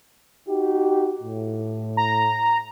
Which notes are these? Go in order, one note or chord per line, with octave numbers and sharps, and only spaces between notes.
D#4 F#4 G4
A2
A#5